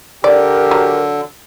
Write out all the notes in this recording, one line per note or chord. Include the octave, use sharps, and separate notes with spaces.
D3 G4 A#4 D5
F#3